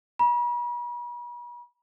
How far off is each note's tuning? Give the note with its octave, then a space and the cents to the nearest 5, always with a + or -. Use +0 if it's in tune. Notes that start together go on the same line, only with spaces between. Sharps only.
B5 -45